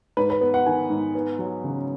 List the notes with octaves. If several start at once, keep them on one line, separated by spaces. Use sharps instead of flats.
G#2 B4
B4
B3
F#5
D#3 G#5
G#2
B3
F#3
C#3